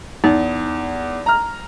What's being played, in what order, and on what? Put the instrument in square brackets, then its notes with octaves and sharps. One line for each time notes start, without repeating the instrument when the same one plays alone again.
[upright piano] E2 [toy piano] D#4
[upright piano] A#5 F6